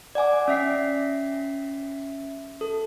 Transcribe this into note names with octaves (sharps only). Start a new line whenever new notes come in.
D5 F#5 G#5 D6
C#4 E5 B6 C7
A4